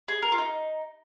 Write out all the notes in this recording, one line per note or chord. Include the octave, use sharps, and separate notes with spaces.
G#4
A#4
F4
D#4